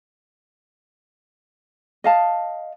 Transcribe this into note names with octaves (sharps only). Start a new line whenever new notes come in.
D#5 F5 A5